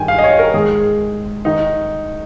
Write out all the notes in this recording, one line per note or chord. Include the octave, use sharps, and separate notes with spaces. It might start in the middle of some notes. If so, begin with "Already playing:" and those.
Already playing: G2 D#3 G5 G#5
F5
D#5
C#5
A#4
G#2 D#3 G#4
D#3 D#4